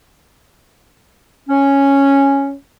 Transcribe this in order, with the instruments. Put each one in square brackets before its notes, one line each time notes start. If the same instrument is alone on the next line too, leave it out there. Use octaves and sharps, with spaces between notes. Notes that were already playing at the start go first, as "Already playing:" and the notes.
[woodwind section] C#4